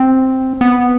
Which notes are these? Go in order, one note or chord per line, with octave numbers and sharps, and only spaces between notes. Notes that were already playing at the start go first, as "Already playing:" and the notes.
Already playing: C4
B3